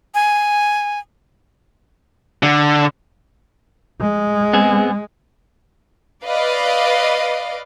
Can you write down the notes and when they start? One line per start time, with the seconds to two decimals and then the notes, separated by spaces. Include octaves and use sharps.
0.15 G#5
2.43 D3
4.01 G#3
4.53 B3 C4 G#4
6.24 B4 D5 D#5 F5